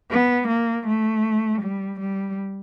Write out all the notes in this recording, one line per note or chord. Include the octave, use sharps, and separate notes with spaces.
B3
A#3
A3
G3
G3